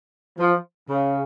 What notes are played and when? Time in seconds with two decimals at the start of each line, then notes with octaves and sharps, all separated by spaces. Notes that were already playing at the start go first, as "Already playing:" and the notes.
0.38 F3
0.90 C#3